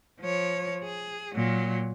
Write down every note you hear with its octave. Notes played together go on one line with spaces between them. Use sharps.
F3 C#5
G#4
A#2 F#3